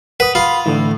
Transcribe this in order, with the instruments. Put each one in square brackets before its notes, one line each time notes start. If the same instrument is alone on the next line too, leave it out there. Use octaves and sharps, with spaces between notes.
[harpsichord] B4 [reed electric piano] F#5 D#6
[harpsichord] F4 [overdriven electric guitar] B5
[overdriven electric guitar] A2 [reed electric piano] D3 E3 E4